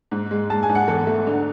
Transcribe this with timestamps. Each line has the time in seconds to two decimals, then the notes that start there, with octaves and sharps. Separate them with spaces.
0.11 G#2
0.31 G#3
0.50 G#3 A5
0.63 G#5
0.69 G#2
0.75 F#5
0.88 E2 A4
1.07 A3
1.27 D3